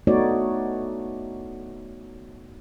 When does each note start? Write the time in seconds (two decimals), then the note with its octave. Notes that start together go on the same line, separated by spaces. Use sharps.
0.07 A3 B3 D#4 F#4 C#5 D5